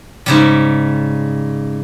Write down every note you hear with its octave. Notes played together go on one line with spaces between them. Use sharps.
G#2 C#3 G3